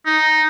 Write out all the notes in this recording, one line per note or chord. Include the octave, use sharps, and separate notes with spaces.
D#4